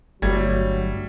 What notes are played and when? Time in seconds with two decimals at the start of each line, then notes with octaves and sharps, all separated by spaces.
0.22 G1 F#3 G3 A3 G#6